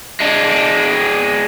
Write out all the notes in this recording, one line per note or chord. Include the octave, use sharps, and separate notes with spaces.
G#3 D4